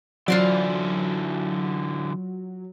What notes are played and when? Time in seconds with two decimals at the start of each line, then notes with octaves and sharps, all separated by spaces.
0.28 D3 E3 F#3 F4 C5 D5